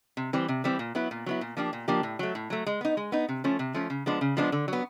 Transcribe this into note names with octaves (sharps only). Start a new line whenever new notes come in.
C3
E3 G3 C4
C3
E3 G3 C4
A#2
F#3 B3 E4
A#2
F#3 B3 E4
A#2
F3 A#3 D4 G4
A#2
F3 A#3 D4 G4
A2
F#3 A3
A2
F#3 A3
G#3
B3 D#4
G#3
B3 D#4
C3
F3 A3 C#4
C3
F3 A3 C#4
C#3
F3 G#3 B3 D4
C#3
F3 G#3 B3 D4
D3
F#3 B3